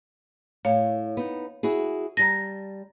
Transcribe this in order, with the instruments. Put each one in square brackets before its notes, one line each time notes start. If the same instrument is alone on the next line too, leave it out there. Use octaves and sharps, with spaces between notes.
[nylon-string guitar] A2 [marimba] C#5 F5
[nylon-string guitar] B3 D#4
E4 F#4 G#4
[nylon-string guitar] G3 A5 [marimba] A#5 A#6